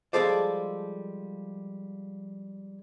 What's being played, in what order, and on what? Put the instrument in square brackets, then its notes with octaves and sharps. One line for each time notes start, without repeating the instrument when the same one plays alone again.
[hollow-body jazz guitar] F3 G3 G#3 A4 C5 D5